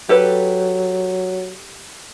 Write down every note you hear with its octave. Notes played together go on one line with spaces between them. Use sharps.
F#3 G4 A4 B4